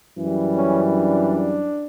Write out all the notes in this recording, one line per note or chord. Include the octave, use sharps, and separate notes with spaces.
F#2 E3 G3
C#4
D4